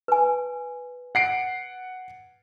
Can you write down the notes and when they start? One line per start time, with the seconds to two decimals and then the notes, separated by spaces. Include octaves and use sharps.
0.08 B4 G#5
1.15 F#5 C7 D7